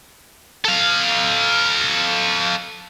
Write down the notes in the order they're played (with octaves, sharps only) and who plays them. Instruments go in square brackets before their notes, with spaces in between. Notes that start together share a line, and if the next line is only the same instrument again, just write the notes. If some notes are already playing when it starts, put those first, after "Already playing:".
[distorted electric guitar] A4 F5